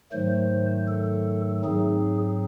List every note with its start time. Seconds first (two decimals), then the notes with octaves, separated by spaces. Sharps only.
0.12 G#2 D#3 F#3 A3 C5
0.88 A4
1.64 G#2 F#3 C4 D#4 G#4